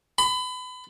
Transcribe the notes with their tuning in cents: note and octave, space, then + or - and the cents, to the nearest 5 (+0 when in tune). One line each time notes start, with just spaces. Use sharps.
B5 +30